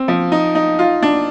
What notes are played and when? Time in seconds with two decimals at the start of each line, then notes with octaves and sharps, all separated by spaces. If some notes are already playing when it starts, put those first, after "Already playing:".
Already playing: C4
0.08 F3
0.32 D#4
0.55 D#4
0.79 F4
1.02 D4